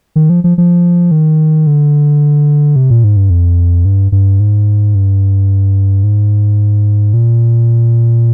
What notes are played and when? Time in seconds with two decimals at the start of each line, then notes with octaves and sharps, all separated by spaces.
0.16 D#3
0.30 F3
0.44 F3
0.58 F3
1.11 D#3
1.67 D3
2.76 C3
2.90 A#2
3.04 G#2
3.17 G2
3.30 F2
3.85 G2
4.12 G2
4.40 G#2
4.95 G2
6.03 G#2
7.14 A#2